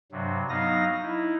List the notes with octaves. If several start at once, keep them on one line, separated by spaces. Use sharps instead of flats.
G2 C3 F#3
F#3 B3 D#4 F5 D#6 A#6
D#4 E4